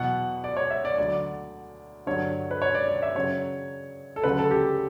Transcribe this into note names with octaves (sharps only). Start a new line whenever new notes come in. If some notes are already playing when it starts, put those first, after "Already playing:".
Already playing: E2 B2 F#3 F#5
D5
C#5
E5
D5
D2 D3 F#3 D5
G2 D3 F#3 C#5
B4
C#5
D5
D5
E5
F#2 C#3 F#3 C#5
A4
D2 C#3 F#3 B4
A4
G4